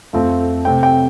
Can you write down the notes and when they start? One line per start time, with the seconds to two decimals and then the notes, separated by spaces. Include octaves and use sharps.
0.13 F2 F3 A3 C4
0.65 C3 A3 C4 G5
0.83 G5